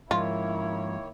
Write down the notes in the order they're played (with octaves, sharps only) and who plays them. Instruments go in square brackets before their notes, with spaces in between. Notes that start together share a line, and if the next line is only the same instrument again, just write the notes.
[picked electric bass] G#2 F3 [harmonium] D#3 A#3 C#5 [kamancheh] E4 [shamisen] F4